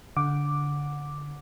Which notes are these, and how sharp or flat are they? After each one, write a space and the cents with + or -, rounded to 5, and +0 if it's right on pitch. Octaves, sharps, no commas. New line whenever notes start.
D3 -20 F#5 -20 D6 +0